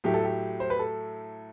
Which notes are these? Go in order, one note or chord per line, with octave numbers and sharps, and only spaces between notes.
A2 F#3 A3 G4
A4
G4
C5
B4
A4